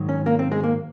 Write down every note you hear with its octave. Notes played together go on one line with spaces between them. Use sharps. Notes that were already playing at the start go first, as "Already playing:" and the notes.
Already playing: G#2 D#3 F#3
C#4
A#3
C4
G#3
A#3